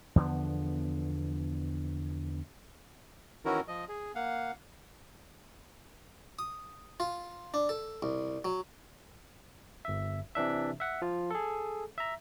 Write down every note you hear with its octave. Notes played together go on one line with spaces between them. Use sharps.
E2 D3 F3 B3
D#3 E3 C#4 E4 F#4 A#4
F3 D#5
G#4
A#3 F5 F#5
D#6
F4
D4
A4
C2
F#3
G1 E5
C3 E3 D4 E5
E5 F#5
F3 F4
G#4 A4
E5 A#5